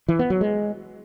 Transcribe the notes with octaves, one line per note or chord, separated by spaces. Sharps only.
E3
B3
F#3
G#3